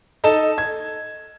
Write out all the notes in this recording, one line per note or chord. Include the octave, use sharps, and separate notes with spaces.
D#4 A4 A5 E7
G#6